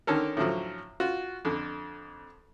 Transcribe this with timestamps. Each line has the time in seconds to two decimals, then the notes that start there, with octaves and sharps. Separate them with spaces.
0.07 D3 D#3 C#4 A4 A#4
0.37 A2 D3 F3 F#3
1.00 F4 F#4
1.45 F2 D3